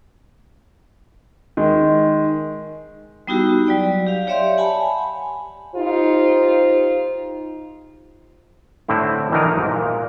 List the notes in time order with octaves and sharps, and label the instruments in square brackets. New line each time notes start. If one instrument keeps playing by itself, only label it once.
[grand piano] D#3 G#3
[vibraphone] G3 B3 D#4 E4 F#4 G4
F#3 D5 G5
G4 F5
G4 C#5 D5 E5 F5 C6
F#5 G#5 A5 B5
[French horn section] D#4 F4 G4 C5
[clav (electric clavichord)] A2 D3 C4 E4
D#3 E3 D4 D#4 A#4 D#5
B1 G#2
A#2